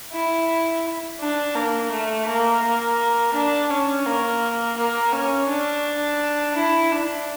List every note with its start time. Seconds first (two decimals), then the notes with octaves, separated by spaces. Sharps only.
0.12 E4
1.20 D4
1.55 A#3
1.91 A3
2.27 A#3
2.62 A#3
3.34 D4
3.70 C#4
4.06 A#3
4.77 A#3
5.13 C#4
5.49 D4
6.57 E4
6.92 D4